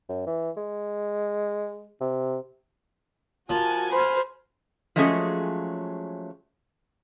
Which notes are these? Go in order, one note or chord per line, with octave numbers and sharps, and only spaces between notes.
F#2
E3
G#3
C3
F3 F#4 A#4 G#5 A5
C5 B5 F6
F3 F#3 G#3 A3 C#4 G#4